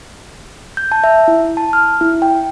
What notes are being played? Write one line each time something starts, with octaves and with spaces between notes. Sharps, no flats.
G6
A5
E5
E4
A5
F6
E4
G5